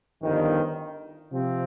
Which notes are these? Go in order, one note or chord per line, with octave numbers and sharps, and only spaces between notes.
G1 F2 D#3
C3 F3 C4